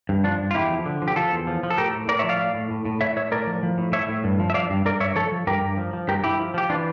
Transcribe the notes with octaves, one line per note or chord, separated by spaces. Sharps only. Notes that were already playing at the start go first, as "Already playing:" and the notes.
G2
F3 D4 F4
G2
F4
E2 E4 G4
F3
D3
F3
G4
F3 F4 A4
E2
F3
F3
A4
A2 G4 A#4
A2
A2 A#4 D5
C#5 E5
F3
D5 F5
A2
A2
A2
A2
A2 C#5 E5
A2 C#5 E5
A2 A#4 D5
F3
F3
A2
A2 C#5 E5
A2
G2
F3
E5
F3 D5 F5
G2
G2 A#4 D5
G2 C#5 E5
F3 A4 C#5
F3
G2 G4 A#4
G2
F3
F3
G2 G4 A#4
G2 E4 G4
F3
F3 G4
E3 D4 F4